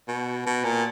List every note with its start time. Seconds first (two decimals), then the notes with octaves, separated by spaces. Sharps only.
0.08 B2
0.46 B2
0.64 A#2